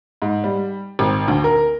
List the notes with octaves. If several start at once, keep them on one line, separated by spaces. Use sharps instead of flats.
G#2
G3
G#1
D2
A#4